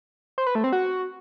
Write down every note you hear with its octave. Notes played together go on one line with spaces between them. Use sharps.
C5
B4
A3
C4
F#4